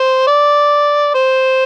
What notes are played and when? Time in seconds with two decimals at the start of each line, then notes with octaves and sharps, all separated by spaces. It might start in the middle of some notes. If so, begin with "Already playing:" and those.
Already playing: C5
0.27 D5
1.14 C5